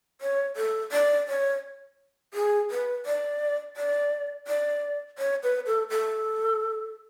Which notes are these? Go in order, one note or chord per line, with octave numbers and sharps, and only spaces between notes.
C#5
A4
D5
C#5
G#4
B4
D5
D5
D5
C#5
B4
A4
A4